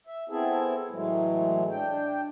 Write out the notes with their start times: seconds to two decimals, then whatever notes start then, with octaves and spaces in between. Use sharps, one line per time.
0.07 E5
0.29 B3 C4 E4 G#4 A4 E5
0.91 A2 E3 F#3 G#3 A3
1.71 D4 G5